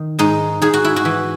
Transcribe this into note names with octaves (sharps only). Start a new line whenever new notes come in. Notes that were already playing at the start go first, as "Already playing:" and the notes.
Already playing: D#3
G#2 D#4
G#2 G#4
F#4
E4
F#4
E3